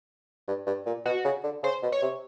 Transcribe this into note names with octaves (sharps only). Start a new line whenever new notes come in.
G2
G2
A#2
B2 F#4
C#3
D3
C#3 C5
B2
C#5
C3